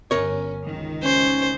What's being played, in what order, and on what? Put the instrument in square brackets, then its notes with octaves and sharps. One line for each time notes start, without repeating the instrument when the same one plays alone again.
[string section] G1 C#4 [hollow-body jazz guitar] A#4 C#5
[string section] C#2 D#3
[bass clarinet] C#4 [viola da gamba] C5